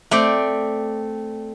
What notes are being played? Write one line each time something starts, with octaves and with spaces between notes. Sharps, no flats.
A3 C4 D5 G5